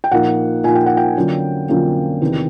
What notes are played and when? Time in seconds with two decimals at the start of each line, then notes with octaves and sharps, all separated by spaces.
0.04 G5
0.12 A#1 A#2 F3 A#3 D#4 F#5
0.64 A#1 A#2 F3 A#3 D#4 G#5
0.75 G5
0.86 F#5
0.97 G5
1.17 F2 D3 F#3 A#3 C#4
1.68 F2 D3 F#3 A#3 C#4
2.21 E2 C3 D#3